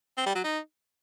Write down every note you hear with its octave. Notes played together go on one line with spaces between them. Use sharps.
C4
G3
F#3
D#4